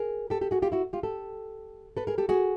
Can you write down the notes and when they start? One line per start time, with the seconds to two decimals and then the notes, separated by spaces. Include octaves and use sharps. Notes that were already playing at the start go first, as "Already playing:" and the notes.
Already playing: G#4 A#4
0.30 G4 A4
0.41 G4 A4
0.51 F#4 G#4
0.62 F4 G4
0.72 E4 F#4
0.93 F4 G4
1.03 G4 A4
1.97 A4 B4
2.07 G#4 A#4
2.18 G4 A4
2.29 F#4 G#4